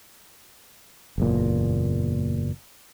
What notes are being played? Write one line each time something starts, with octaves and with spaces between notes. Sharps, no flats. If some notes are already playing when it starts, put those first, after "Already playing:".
F#1 E2 A#2